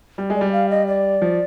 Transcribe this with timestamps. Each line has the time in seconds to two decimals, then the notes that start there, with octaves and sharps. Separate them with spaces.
0.18 G3
0.30 G#3
0.35 D5
0.41 G3
0.52 F5
0.70 D#5
0.87 D5
1.22 F3